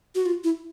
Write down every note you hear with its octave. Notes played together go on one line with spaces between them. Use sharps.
F#4
F4
E4